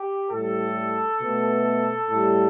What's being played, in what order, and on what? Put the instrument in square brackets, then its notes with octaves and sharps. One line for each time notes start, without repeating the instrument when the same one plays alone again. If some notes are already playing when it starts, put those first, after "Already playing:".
Already playing: [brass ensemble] G4
A2 G3 A4
B2 A3
A2 G3